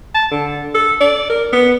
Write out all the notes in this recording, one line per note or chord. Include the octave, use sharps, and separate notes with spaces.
A5
D3
A4
D5
A#4
B3